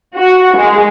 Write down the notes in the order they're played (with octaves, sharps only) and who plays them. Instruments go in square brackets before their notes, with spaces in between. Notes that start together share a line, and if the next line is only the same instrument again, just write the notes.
[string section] F#4
G#3